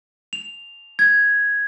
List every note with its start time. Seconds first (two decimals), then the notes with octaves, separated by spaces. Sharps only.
0.33 F7
0.99 G#6